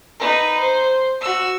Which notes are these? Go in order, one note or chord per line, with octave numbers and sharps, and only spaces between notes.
D#4 B4
C5
F#4 E6